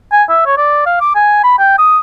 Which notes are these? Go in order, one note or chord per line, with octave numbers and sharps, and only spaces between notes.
G#5
E5
C#5
D5
F5
D6
G#5
B5
G5
D#6